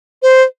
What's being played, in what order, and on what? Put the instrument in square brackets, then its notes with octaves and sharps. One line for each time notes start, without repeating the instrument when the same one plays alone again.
[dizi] C5